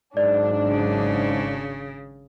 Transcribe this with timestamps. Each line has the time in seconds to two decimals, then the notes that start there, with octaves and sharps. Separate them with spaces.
0.17 G#1 G#2 F#3 D4 D5
0.68 C#3